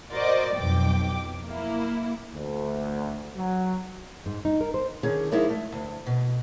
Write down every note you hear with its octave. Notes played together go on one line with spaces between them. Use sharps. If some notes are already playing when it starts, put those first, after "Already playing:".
F#4 A#4 C5 D5 D#5 D6
B1 F2 B2 G5 D6
A#3 E4
D2
F#3
G#2
D#4
A#4
C5
D3 D#3 C#4 G#4
F3 G#3 D#4 E4 A#4 D5
A3
D2
B2